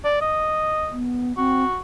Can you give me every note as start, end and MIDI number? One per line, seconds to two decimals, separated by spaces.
0.04 0.17 74
0.21 0.95 75
0.92 1.33 59
1.37 1.64 60
1.37 1.79 66